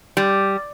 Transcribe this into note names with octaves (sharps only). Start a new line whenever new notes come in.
G3